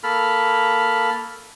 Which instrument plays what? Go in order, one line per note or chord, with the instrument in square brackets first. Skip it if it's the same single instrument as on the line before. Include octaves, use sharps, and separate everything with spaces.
[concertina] A#3 A4 B5 F6